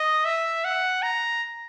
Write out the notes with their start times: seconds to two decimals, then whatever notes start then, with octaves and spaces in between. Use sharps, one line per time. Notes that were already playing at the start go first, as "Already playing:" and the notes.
Already playing: D#5
0.25 E5
0.64 F#5
1.03 A#5